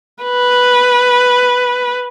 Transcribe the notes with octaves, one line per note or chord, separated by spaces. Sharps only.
B4